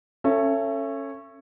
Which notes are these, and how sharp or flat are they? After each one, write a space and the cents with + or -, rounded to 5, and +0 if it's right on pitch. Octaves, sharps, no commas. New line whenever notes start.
C#4 -10 A4 +20 E5 +35